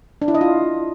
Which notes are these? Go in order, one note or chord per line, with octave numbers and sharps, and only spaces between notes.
D4
E4
D#5
F4